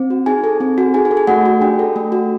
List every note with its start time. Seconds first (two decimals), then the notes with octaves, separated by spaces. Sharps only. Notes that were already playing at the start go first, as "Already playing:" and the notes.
Already playing: C4
0.10 F#4
0.26 D#4 G#4 G#5
0.44 A4
0.60 C4
0.78 F#4
0.94 D#4 G#4 G#5
1.05 G#4 G#5
1.11 A4
1.17 G#4 G#5
1.27 A3 F#4 F#5
1.45 F#4
1.61 D4 G4 G5
1.79 A4
1.96 A3
2.12 F#4